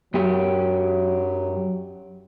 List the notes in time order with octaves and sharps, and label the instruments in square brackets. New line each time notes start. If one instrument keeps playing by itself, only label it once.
[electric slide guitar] F#2 G4 [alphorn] F#3